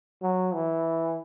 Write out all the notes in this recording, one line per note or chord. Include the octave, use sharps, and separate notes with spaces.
F#3
E3